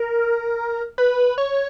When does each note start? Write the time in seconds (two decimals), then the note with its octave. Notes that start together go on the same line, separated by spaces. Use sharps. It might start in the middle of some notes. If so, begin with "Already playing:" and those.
Already playing: A#4
0.98 B4
1.38 C#5